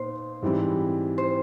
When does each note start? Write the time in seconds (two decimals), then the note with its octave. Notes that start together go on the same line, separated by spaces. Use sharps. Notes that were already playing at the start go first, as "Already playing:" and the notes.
Already playing: A#2 B3 D#4 C5
0.42 G#2 E3 G3 C4 E4
1.18 C5